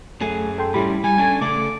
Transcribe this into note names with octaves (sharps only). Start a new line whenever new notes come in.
F#2 F#3 A3 G#4
A4 G5 C6
A2 G3 C#4 E4 G4 B5
G3 G#5
C#4 D4 A4 G#6
C#3 A3 A4 D5 D6